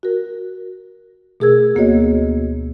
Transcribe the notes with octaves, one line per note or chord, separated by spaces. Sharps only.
F#4 A#4
B2 A3 G#4 A#4 E6 G#6
D2 A#3 B3 F#4 C#5 D#5